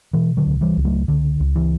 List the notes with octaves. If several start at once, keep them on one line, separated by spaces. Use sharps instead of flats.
B2 E3
D3 F#3
C#2
E3 G3
C#2
F#3 A3
C#2 D3
C#2
E3